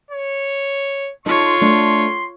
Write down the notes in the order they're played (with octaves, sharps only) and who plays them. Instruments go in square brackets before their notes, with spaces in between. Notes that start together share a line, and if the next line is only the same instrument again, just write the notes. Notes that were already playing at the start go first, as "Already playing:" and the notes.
[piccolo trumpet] C#5
[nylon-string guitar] D#4 A4 [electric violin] F4 C#5 [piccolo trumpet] C6
[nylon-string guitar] A3 D4